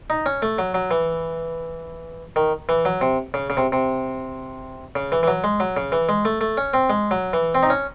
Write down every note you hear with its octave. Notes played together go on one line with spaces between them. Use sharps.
D#4
C#4
A3
F#3
F#3
E3
D#3
E3
F#3
C3
C#3
C#3
C3
C3
C#3
E3
E3
F#3
G#3
F#3
C#3
E3
G#3
A3
A3
C#4
C4
G#3
F#3
E3
C4
D#4
C#4